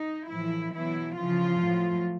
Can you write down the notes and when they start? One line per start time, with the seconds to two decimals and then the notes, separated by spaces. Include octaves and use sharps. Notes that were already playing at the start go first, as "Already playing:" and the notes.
Already playing: D#4
0.29 A2 E3 F3 E4
0.74 B2 E3 F#3 E4
1.18 C#3 E3 F3 F4
1.61 A2 F#3